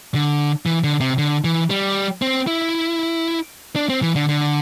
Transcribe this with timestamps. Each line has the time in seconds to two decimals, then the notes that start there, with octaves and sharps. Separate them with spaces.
0.15 D3
0.66 E3
0.84 D3
1.00 C3
1.18 D3
1.44 E3
1.70 G3
2.22 C4
2.47 E4
3.76 D4
3.89 C4
4.02 E3
4.16 D3
4.29 D3